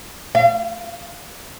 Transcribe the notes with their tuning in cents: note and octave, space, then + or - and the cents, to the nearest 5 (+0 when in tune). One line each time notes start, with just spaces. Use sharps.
F5 -45